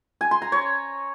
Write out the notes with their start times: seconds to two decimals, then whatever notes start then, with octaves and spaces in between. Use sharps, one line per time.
0.21 G#5
0.31 C6
0.42 A#5
0.52 C#5